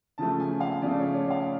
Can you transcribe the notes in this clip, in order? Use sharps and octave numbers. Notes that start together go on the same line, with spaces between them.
C#3 F3 A3 A5
G#5
F5
C#3 F3 A3 D5
C#5
D5
F5